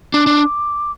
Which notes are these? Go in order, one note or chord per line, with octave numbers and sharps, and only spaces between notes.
D4 D6
D4